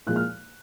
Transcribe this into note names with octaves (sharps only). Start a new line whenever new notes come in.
A#2 F3 G#3 F#6
F6